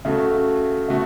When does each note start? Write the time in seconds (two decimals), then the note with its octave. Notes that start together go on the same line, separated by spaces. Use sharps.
0.05 C#3 A3 F#4 A4
0.88 C#3 A3 F#4